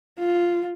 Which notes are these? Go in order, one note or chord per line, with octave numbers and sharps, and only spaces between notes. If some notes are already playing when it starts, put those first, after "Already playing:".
F4